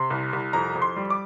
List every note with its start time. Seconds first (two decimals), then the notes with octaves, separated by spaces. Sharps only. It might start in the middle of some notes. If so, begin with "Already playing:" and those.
Already playing: C3 C6
0.10 C2
0.33 C2
0.53 F2 A#5
0.75 F2
0.82 C6
0.96 G3
1.10 D6